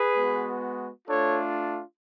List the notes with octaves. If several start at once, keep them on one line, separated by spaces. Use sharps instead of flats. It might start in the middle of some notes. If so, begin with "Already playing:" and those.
Already playing: G#4 B4
G#3 B3 F#4
A3 D4 F4 A4 C#5